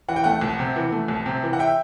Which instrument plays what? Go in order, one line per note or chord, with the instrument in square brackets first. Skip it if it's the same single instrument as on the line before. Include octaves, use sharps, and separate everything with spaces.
[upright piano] E3 [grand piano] F#5
[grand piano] G5
[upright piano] A3 [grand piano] F#5
[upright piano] C2
C3
E3
A3
C2
C3
E3
[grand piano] F#5
E5 G5